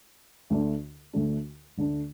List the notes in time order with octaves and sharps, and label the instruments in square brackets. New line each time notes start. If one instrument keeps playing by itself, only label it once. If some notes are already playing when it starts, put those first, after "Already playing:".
[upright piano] D2 D3 A3 D4
D2 D3 A3 D4
D2 D3 A3 D4